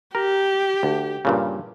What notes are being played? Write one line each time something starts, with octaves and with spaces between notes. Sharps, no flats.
G4 A#4
D2
G2 A#2 C#3